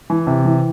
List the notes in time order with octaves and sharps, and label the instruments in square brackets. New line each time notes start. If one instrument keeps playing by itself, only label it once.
[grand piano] E3
C3
E3